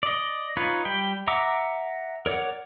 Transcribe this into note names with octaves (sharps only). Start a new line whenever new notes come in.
D5 D#5
D#4 F4 B4 C#5
G3 G5 B5
E5 F#5 A#5 D6 E6
A#4 C#5 D5 F#5